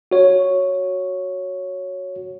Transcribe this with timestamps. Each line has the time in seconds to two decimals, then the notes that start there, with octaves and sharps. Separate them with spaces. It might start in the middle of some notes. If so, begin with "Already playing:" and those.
0.11 F#4 C#5